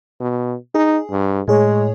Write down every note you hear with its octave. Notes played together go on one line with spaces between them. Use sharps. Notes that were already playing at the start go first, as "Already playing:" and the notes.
B2
D#4 G#4
G2
A2 G#3 G#4 C#5